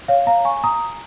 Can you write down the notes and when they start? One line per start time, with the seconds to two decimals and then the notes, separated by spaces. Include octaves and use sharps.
0.08 C#5 F5
0.27 F5 A#5
0.45 G#5 C#6
0.64 A#5 D#6